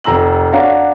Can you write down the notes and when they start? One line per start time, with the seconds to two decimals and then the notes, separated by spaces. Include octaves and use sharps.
0.04 F1 A#5 E6 F#7
0.52 D4 F#4 C#5 F5 F#5 A#5